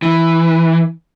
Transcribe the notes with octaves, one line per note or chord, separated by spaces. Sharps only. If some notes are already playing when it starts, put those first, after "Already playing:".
E3